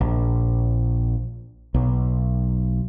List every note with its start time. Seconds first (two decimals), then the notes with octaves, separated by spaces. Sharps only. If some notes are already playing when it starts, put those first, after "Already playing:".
0.01 A#1
1.74 B1